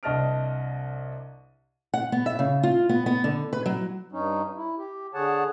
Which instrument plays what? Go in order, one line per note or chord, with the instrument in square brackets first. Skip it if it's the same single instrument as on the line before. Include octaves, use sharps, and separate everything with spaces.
[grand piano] C2 D4 D#5 A5 F6 D7
[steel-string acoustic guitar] F#5
B3
E5
C#3
F4
B3
B3
D3
B4
F#3
[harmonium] G2 C#4 D#4
E4
G4
D3 G#4 C#5 F#5 A5